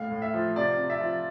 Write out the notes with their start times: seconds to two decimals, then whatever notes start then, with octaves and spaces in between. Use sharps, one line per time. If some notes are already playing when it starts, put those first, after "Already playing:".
Already playing: A2 F5
0.11 A2
0.22 E5
0.34 F3
0.56 C3 D5
0.79 C3
0.90 E5
1.01 F3